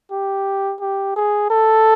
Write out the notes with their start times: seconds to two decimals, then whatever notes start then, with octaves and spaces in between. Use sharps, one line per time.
0.12 G4
0.80 G4
1.16 G#4
1.50 A4